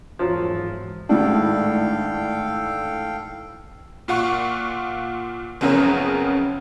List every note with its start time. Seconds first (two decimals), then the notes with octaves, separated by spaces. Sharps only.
0.19 G#1 E2 F3 F#3
1.09 G#1 A2 D4 A4 F5 G5
4.08 A#2 F4 F#5 C#6
5.61 F#1 F2 C#3 B3 C#4 A#4